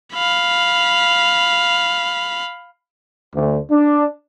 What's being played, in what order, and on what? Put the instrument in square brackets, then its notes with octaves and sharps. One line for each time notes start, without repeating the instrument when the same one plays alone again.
[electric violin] F5 B5
[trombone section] D2
D4